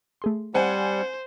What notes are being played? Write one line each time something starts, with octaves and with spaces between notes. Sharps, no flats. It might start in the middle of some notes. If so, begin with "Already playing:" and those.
A3 G#4 C6
G3 C4 C5 F#5 G#5